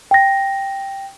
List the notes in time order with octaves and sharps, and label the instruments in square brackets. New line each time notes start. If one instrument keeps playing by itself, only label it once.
[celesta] G5 A#6